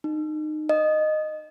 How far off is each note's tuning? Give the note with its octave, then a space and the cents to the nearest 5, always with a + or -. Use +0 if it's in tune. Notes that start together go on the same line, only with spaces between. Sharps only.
D#4 -25
D#5 -10